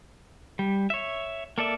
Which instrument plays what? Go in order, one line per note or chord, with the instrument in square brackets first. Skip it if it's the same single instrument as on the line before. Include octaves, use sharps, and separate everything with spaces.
[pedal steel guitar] G3
C#5 E5
A#3 A4 D5 E5